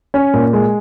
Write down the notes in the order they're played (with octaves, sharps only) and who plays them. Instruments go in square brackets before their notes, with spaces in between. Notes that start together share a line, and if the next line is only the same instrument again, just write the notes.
[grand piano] C#4
A#2
G#3